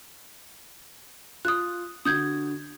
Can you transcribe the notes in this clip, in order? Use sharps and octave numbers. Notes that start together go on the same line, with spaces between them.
F4 D#6 F#6
D3 F#4 D#6 G6 G#6